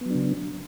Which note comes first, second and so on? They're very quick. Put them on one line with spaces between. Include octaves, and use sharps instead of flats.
B3 F#3 D4 C#3